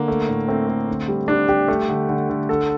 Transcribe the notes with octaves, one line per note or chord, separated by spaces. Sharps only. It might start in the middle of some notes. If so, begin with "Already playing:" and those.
Already playing: D3 A#3
A3
A2
A3 C4
A3
D3
G3
G3 D4
G3 G4
A3
D3
D3
D3
D3 A4